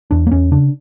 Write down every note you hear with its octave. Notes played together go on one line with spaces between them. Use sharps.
E2 D4
A#3
E2 C#4
C#3 D4